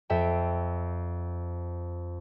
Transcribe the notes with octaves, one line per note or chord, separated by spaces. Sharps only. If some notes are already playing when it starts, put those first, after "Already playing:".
F2 E5 G5